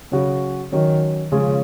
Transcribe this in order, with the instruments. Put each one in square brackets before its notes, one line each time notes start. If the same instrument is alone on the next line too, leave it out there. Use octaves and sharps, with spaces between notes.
[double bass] C#3 [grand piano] F#3 C#4 F#4
[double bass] D#3 [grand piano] F#3 C#4 F#4
[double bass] C#3 [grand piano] F3 G#3 C#4 F4 G#4